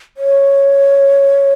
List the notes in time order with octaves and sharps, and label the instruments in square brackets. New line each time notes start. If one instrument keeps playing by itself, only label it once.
[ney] C#5